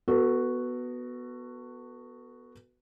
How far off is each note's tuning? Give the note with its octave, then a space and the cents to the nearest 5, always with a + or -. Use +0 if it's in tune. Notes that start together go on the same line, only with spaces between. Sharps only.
B3 +0 F#4 +0 A4 +30